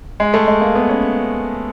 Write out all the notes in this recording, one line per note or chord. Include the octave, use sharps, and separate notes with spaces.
G#3
A3
G#3
A#3
B3
C#4